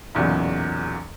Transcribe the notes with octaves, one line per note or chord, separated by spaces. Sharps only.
B1 E2 A#2 C#3 F#3